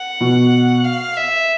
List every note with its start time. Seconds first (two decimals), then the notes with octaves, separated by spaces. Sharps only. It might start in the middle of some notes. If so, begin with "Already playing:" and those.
Already playing: F#5
0.21 B2
0.84 F5
1.17 E5